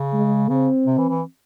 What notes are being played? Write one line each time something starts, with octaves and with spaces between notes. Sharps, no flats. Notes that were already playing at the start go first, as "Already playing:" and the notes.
Already playing: C#3
G#3
C#3 C4
C3
E3
E3